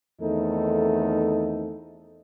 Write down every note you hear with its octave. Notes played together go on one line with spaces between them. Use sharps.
E2 D#3 A3 C4 D#4 A4